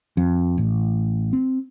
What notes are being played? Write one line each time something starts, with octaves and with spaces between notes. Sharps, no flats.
F2
A1
C4